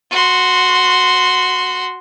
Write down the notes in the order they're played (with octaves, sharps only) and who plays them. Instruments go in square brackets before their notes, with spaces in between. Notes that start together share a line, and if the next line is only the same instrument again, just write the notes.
[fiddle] F#4 C6